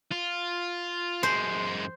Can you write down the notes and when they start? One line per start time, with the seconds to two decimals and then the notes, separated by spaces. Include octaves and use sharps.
0.11 F4
1.23 F#2 G#3 C5